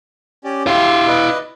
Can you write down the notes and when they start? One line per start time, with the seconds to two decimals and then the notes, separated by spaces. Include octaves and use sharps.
0.44 C#4 G4 D5
0.67 E4 G4 F5 C6 E6
1.08 B4 D5 D#5